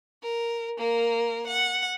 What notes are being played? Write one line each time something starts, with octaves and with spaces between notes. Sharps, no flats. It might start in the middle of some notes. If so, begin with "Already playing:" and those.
A#4
A#3 A#4
F#5